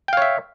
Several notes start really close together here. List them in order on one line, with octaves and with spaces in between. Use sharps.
G5 F5 C#5 E5